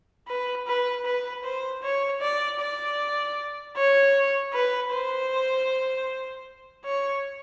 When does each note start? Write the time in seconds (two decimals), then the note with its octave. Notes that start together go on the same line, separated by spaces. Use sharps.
0.28 B4
0.67 B4
1.05 B4
1.44 C5
1.83 C#5
2.21 D5
2.60 D5
3.76 C#5
4.53 B4
4.92 C5
6.85 C#5